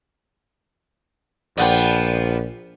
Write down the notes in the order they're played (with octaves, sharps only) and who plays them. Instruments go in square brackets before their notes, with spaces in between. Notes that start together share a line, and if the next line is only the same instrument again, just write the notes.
[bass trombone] A#1 [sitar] F3 B3 [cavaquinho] D5 F#5 G5